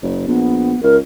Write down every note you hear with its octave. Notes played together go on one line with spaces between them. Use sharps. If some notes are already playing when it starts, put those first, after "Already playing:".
F#1
A#1 B3
C#2 A#4